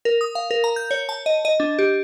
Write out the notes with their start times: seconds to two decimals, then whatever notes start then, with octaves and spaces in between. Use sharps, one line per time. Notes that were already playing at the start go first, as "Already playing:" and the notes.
0.05 A#4
0.21 D#6
0.35 F5
0.51 A#4
0.64 A#5
0.76 G6
0.91 C#5
1.09 A5
1.26 D#5
1.45 D#5
1.60 D4
1.79 G4